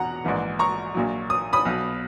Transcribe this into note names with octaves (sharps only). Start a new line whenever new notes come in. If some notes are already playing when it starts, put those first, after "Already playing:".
Already playing: E2 B2 F#5 A#5
A#1 G#2 E3
A#5 C#6
A#1 A#2 F#3
D#6
B5 D#6
B1 B2 F#3